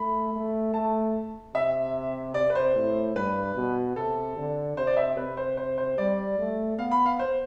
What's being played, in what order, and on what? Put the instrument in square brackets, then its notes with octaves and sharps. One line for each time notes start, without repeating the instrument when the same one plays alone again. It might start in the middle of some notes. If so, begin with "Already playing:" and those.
Already playing: [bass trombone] A3 [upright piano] B5
[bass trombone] A3
[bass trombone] A3 [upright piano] A5
[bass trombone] C3 [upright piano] E5
[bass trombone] C3 [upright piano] D5
[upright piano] B4
C5
[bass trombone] A2
[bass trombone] G2 [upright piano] B4
[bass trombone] B2
[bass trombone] C3 [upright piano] A4
[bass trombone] D3
[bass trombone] C3 [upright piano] C5
[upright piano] D5
E5
[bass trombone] C3 [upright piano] B4
[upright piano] C5
C5
C5
[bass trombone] G3 [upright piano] D5
[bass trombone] A3
[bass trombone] B3 [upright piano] F5
[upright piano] B5
F5
C5